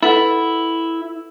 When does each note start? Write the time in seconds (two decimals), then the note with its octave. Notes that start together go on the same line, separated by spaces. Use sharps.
0.03 E4 A4 B4 F#5